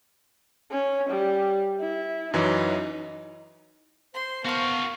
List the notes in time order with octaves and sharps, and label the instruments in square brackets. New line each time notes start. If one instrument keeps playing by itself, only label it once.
[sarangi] C#4
G3
E4
[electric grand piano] F#2 E3 F#3 [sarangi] D#4
[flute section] C5 [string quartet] C6
[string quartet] A#3 [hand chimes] B3 A5 C#6 [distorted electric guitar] F#4 F5